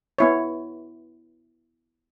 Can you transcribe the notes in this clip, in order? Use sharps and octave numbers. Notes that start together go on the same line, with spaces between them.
B3 E4 C#5